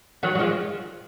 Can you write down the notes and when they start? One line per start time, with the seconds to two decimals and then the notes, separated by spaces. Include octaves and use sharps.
0.23 D#3 F#3
0.35 F#3
0.39 F3 G#3